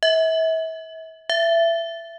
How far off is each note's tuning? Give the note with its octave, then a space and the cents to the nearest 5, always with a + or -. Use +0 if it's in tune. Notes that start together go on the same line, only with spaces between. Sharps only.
E5 -35
E5 +20